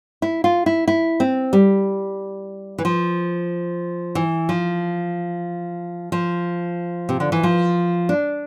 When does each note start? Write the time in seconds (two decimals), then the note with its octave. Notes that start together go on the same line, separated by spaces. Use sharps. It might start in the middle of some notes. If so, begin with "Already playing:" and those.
0.22 E4
0.44 F4
0.66 E4
0.88 E4
1.20 C4
1.53 G3
2.78 E3
2.85 F3
4.15 E3
4.49 F3
6.12 F3
7.09 C3
7.20 D3
7.32 E3
7.43 F3
8.09 D4